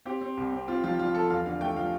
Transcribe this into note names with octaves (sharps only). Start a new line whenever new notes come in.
C4 G4
C4
C2
C4
C4 F4
F3 F4
F3 F4
F3 A4
E2 F5
D3 F5
A3 G5
F3 F5